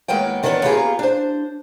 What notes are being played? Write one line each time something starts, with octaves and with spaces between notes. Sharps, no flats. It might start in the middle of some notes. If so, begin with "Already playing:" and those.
D#2 G#3 A#3 B3 G5
E2 D#3 G#3 B3 D4 C#5
A#3 B3 F4 G4 G#4 A#5
D4 C5